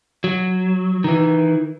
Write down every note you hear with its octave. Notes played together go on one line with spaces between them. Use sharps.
F#3
D#3 E3